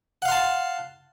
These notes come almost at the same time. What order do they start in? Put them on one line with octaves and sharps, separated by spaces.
F#5 F5 C6 A5